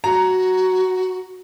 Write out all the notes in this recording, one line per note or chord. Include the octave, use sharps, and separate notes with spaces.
F#4 A#5